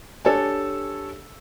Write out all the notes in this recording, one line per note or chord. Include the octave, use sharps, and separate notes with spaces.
D4 G4 A4 C#5 G#5 A5